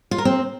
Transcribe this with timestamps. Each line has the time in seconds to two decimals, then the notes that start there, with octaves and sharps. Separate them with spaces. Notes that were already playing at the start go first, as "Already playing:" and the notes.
0.11 F4
0.18 A#4
0.25 C4